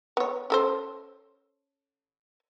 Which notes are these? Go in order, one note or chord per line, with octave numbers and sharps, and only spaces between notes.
B3 C#5
C#4 A4 C5